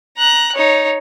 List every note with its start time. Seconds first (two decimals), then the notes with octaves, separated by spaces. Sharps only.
0.18 A#5 F#6
0.55 D#4 C#5